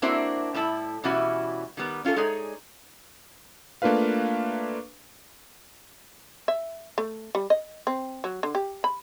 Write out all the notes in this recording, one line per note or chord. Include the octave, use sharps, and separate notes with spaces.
A#3 C4 D4 E4 F#4 C5
A2 G3 E4 A5
B2 E3 G3 C#4 E4 F#4
D#3 G3 B3
C#4 F4 G4 A4
G#3 D#4 G#4 C#5 D5
A3 A#3 D4 F4 B4 F5
E5
A3
G3
D#5
C4
F#3
D3
G4
B5